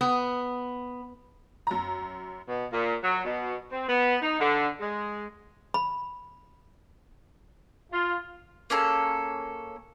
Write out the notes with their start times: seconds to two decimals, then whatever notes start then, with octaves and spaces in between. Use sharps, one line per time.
0.01 B3
1.67 F#2 A#5
2.48 B2
2.72 A#2
3.04 F#3
3.25 B2
3.72 C4
3.89 B3
4.22 D#4
4.40 D3
4.80 G#3
5.74 B5
7.92 F4
8.70 A#3 C#4 G#4 A4